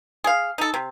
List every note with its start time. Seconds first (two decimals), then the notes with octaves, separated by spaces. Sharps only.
0.24 G#4 F5
0.58 D#4 A4
0.74 C3